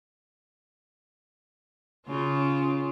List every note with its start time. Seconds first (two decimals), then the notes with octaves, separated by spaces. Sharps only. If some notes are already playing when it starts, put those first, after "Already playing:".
2.07 C#3 F4